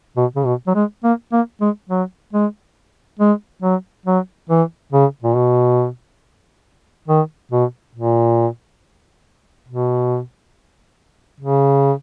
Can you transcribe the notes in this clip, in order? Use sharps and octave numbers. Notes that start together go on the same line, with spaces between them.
B2
C#3
B2
F#3
G#3
A#3
A#3
G#3
F#3
G#3
G#3
F#3
F#3
E3
C#3
A#2
B2
D#3
B2
A#2
B2
C#3